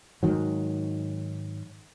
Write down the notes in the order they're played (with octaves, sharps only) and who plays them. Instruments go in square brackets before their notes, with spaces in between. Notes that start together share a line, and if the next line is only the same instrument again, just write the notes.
[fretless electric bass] G#2 D#3 F#3